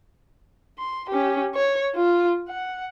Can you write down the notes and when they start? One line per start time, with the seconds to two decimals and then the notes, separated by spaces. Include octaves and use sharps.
0.79 C6
1.10 C#4 G4
1.55 C#5
1.96 F4
2.48 F#5